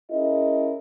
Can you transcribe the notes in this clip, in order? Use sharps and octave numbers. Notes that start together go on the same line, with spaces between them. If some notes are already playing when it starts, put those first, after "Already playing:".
C#4 E4 G#4 A#4 D#5